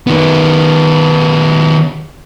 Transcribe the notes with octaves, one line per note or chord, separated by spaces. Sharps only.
D#3 B3